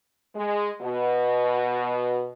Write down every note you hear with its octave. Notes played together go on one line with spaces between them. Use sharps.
G#3
B2